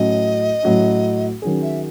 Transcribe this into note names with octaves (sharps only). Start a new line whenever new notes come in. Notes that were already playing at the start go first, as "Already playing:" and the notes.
Already playing: A2 F#3 C#4 D#5
A2 F#3 C#4
D#3 F#3 C#4 G#4
E5